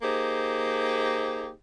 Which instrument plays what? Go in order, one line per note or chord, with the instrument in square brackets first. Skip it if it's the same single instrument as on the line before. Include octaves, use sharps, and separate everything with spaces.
[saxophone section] A#3 D#4 G4 G#4 C5